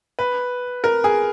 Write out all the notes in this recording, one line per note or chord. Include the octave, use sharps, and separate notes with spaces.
B4
A#4
G#4